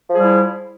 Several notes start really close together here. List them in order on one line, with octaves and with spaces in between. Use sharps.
F3 G#4 G3 E4